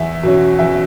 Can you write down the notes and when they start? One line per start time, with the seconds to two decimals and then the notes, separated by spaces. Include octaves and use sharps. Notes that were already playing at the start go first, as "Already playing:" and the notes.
Already playing: E2 E5
0.23 B2 F#3 C#4
0.59 E2 E5